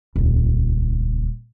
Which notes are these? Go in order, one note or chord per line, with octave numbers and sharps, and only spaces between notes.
D#1 C#2